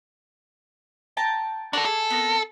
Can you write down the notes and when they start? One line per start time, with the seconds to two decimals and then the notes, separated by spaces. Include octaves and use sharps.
1.17 G5 A5 A#5
1.73 D4 F#4 A4 A#4 D5
1.85 G#4 A4
2.10 B3 C4 A#4